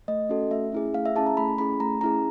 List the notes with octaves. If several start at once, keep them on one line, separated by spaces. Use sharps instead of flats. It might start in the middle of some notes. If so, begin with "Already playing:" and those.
A3 D#5
C#4 F#4 A4
A3 E5
C#4 E4 G#4
A3 F5
E5
C#4 E4 G#4 A5
A#5
A3 B5
C#4 E4 G#4 B5
A3 A#5
C#4 E4 G#4 A#5